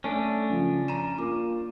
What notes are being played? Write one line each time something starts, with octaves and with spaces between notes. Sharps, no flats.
A3 C#4 D4
C#3 F3
A#5 D#7 E7
A#3 F4 D6